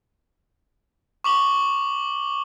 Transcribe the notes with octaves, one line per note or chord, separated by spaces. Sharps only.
C#6 D6 F#7 G7